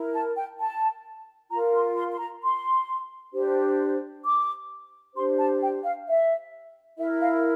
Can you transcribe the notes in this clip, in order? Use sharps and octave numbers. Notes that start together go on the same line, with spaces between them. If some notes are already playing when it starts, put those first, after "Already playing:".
Already playing: E4 A#4
A5
G5
A5
F4 A#4 A#5
C6
C6
C6
A#5
C6
D4 G4 C5
D6
D4 G4 C5 C6
A5
G5
F5
E5
E4 A#4 E5
F5